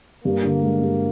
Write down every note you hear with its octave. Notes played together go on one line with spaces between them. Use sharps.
G2 A#3
D3
G#3
G2